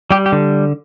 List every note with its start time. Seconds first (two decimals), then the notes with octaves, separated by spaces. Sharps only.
0.11 G3 G4
0.26 G4
0.32 D3